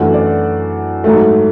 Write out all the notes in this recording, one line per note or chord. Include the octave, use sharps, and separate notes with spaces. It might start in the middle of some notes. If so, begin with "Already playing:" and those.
Already playing: F#2 E3 A3 D4 F#4 F#5
D5
G#2 F#3 A3